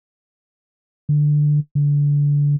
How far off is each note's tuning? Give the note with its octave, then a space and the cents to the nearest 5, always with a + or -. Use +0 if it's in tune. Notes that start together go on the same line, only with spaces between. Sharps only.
D3 +10
D3 -25